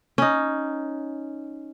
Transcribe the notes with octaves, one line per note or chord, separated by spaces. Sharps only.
C#4 D#4